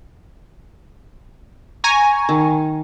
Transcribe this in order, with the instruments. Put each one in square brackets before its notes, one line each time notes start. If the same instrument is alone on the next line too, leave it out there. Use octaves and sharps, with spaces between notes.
[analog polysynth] G#5 A#5 C#6
[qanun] D#3